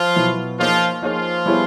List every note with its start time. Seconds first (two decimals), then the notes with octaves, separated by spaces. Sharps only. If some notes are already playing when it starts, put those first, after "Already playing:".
Already playing: F3 F4
0.15 B2 F#3 B3 E4
0.58 F3 A#3 D#4 F4 G#4 C#5
1.02 F3 A#3 D#4 F4 G#4 C#5
1.46 G3 B3 E4 G#4 C#5